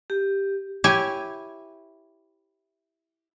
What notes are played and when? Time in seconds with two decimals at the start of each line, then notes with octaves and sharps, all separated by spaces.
0.10 G4
0.84 E4 G4 C#5 G#5